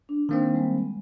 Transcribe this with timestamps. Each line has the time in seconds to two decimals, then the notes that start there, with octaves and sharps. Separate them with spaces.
0.09 D4
0.29 D#3 A#3 C4
0.55 G3 G#3